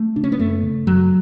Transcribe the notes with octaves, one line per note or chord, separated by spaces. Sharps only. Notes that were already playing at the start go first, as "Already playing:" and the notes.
Already playing: A3
C#3 D4
C#4
B3
F#2 A3
C#3
F#2 F#3